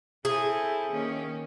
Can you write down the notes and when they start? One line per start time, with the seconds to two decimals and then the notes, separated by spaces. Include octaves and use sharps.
0.25 C4 E4 G#4 A4
0.92 D#3 A#3 C#4